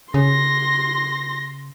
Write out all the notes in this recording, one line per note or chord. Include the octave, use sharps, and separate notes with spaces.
C#3 C6 A#6